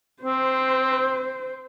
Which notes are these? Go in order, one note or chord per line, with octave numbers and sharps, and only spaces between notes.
C4 C5